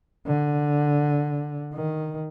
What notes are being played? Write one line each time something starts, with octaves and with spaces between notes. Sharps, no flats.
D3
D#3